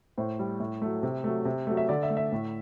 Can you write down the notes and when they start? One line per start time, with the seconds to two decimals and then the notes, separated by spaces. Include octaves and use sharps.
0.18 A2 C5
0.39 G3
0.60 A2
0.82 F#3 A3
1.03 C3
1.24 F#3 A3
1.45 C3
1.67 F#3 A3
1.77 E5
1.89 D3 D5
2.03 E5
2.10 A3
2.17 E5
2.32 A2